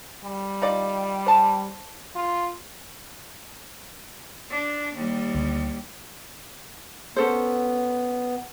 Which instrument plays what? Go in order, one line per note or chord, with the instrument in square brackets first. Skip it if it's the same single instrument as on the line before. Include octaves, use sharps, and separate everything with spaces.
[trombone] G3
[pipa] D#4 F4 D5
C5 A5
[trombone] F4
[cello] D4
D#2 G3
[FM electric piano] D2
[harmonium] B3 [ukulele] C#4 A4 C5